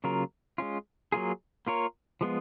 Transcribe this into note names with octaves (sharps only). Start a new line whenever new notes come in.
C#3 F#3 A#3 F4 A#4
G#3 C#4 F4
F#3 A#3 F4 G#4
A#3 F4 A#4 C#5
F3 G#3 B3 F4